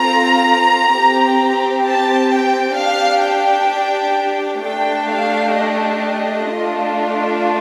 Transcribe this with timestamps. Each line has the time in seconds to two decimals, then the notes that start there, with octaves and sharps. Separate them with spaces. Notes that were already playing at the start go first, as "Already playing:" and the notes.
Already playing: C4 F4 A4 A#5
0.92 C4 G4
1.84 A5
2.30 G5
2.77 D4 G4 F5
3.23 G5
4.61 A3 D4 G4 G5
5.07 F5
5.54 D#5
6.46 A3 D4 F4